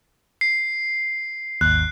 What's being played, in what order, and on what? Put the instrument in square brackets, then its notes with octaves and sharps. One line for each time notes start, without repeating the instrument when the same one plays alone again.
[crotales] C7
[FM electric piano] G#1 D#2 [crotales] F#6